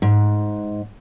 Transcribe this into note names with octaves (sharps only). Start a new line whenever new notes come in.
G#2